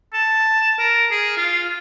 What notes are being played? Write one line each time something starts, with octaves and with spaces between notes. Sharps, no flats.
A5
A#4
G#4
F4